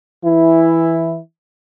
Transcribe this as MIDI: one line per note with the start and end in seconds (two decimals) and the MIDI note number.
0.24 1.19 52
0.24 1.19 64